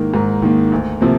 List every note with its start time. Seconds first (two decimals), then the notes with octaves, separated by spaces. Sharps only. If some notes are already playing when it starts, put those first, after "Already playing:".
Already playing: G#2 D#3 A#3 A#4
0.14 G#2 A#4
0.42 D#3 A#3
0.72 D2
1.01 C3 F3 A#3